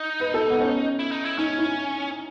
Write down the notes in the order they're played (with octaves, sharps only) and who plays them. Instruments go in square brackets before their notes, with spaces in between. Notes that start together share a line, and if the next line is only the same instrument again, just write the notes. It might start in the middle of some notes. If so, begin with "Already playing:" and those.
Already playing: [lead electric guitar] D#4
[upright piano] B4
A4
B3
C#4
[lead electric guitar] E4
D#4
E4
[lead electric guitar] C#4 [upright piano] D#4
[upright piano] E4